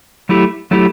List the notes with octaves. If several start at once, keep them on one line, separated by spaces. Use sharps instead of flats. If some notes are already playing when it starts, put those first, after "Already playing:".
F#3 A3 E4 G4
F#3 A3 E4 G4